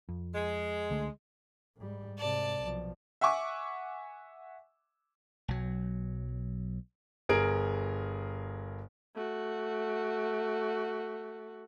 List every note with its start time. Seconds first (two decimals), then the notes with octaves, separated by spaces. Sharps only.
0.09 F2
0.35 G#3
0.90 C#2 D3 A3
1.77 G#2 G3
2.19 G#2 C3 D5 A5
2.62 B1 F3
3.21 E5 F#5 G#5 C#6 D6
5.48 B1 F#3
7.29 G1 G#4 A#4 D7
9.15 A3 F#4